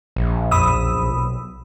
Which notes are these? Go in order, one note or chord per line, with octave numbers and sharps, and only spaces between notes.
A#1
F2 B5 D#6 E6
B1